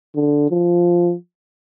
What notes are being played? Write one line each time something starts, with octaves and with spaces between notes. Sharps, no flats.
D3
F3